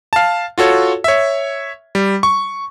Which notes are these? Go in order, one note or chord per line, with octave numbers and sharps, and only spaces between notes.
F5 A5
F4 F#4 A4 C#5
C#5 E5
G3
C#6